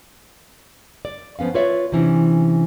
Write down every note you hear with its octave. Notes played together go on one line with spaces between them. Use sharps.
D5
F3 B3 C#4 F5
F4 B4 C#5 D5 E5
C3 E3 C#4 D4